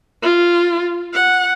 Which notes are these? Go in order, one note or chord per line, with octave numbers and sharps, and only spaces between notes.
F4
F#5